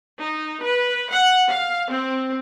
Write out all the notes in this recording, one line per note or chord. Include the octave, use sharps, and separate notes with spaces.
D#4
B4
F#5
F5
C4